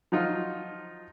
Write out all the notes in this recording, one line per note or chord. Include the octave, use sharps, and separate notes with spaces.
F3 F#3 D#4 F4